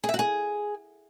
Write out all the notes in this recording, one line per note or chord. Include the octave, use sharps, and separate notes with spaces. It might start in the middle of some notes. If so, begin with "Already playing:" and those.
G#4
E5
F#4
G#4